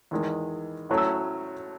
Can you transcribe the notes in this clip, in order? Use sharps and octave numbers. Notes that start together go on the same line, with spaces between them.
E2 D#3 G#3
A2 F#3 A3 C#4
E6